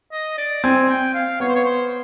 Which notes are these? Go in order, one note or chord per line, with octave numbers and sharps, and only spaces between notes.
D#5
D5
C4 G#5
G5
F5
B3 C#5
C5
C#5
C5